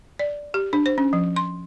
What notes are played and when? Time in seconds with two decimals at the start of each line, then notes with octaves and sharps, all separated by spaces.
0.19 D5
0.54 G4
0.73 D4
0.86 C5
0.98 C#4
1.13 F3
1.36 C6